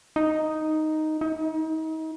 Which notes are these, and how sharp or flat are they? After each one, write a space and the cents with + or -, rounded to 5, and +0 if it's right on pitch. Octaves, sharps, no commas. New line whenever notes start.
D#4 +0
D#4 +35